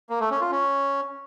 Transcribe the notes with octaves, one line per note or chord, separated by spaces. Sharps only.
A#3
A3
C#4
F4
C#4